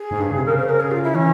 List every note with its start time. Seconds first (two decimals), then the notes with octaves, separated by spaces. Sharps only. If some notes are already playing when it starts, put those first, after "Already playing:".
Already playing: G#4
0.11 G#2
0.20 G2
0.31 C#3
0.37 C3
0.45 C#3 A#4
0.56 C5
0.69 A#4
0.80 G#4
0.91 F4
1.03 E4
1.14 E3 C#4